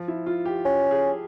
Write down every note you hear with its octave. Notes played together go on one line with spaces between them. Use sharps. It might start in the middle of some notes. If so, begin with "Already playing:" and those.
Already playing: F3
E4
F4
G4
C#4
G#4